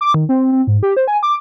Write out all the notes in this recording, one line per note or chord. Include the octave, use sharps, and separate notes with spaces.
D6
D#3
C4
C4
G#2
G4
C5
G#5
D6